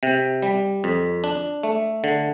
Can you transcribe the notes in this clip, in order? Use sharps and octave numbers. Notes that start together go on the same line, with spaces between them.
C3
G3
F2
D4
A3
D3